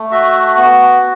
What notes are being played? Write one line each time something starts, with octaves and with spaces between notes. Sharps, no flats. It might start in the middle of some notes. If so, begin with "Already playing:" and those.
Already playing: A3
F#4 E5
B3